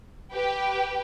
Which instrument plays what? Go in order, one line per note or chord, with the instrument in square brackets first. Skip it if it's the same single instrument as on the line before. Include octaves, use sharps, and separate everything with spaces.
[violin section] G4 B4 G5